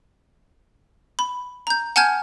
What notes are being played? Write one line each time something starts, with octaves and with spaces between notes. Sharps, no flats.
B5
A#5 G6
F#5 G#5 A5 F6 G6 G#6